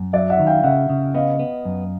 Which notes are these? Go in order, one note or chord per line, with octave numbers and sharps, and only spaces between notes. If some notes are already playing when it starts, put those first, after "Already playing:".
Already playing: F#2
F#3 D5 E5
E5 F#5
D#3
F5 G5
C#3 E5 F#5
C#3
B3 D#5 F5
B3
F#2